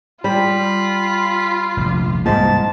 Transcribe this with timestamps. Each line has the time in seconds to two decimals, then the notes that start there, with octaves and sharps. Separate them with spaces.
0.24 G3 F4 B5
1.77 F1 A#1
2.26 C2 G#2 A#3 A5